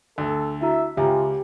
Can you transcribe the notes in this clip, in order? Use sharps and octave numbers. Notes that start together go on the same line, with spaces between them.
D2 A4
E4 F#4 E5 A#5
C#2 F4 G4 E5 G#5 A#5